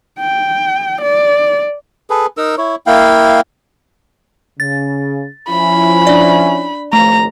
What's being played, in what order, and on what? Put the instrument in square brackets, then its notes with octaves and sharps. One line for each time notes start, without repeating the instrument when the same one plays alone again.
[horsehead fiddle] G5
D5
[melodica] G#4 A4 B4
D#4 A#4 E6
E4 C#5
A#3 E4 F5 G5
[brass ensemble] C#3 [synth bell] A6
[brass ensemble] F3 C#4 E4 [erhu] B5
[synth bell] D4 D5
[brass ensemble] G#1 C#2 F3 [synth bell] A3 [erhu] A#5